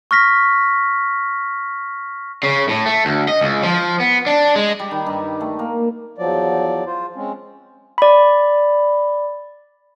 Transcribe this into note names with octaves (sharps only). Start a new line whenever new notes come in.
C#6 F6 A#6 B6
C#3
A2
A3
D2
D#5
C#2
F3
B3
D4
G#3
G3
D#3
G2
A3
A#3
E2 F3 F#3 D5
F4 C5
G#3 C4 C#4
D5 B5